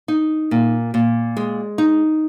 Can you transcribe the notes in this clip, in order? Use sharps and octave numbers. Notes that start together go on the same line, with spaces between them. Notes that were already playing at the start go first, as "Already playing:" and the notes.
D#4
A#2
A#2
G#3
D#4